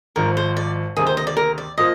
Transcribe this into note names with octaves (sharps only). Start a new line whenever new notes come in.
G#1 G#2 F3 A#4
C5
D5
D2 C3 D#3 A#3 G#4
C5
D#5
D5
A#4
D5
A#2 F3 D#5